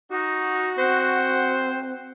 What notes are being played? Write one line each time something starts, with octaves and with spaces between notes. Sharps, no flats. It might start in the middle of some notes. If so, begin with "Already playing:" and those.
D#4 F#4
C4 C5 F#5